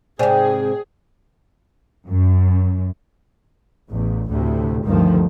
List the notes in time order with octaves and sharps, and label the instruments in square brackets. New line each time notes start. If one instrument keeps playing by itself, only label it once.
[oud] G#2 C3 [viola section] G#4 [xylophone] C5 D5 G#5 [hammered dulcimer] G5
[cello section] F#2
[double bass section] A1 E2
D2 A2 C3
G1 D2 G2 D#3 F3